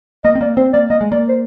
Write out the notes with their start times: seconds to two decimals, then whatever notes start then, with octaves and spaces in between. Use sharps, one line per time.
0.24 A#3 D#5
0.35 C4
0.41 A#3 D5
0.57 C4 C5
0.73 A#3 D5
0.90 A#3 D#5
1.01 G#3
1.12 A#3 D5
1.29 C5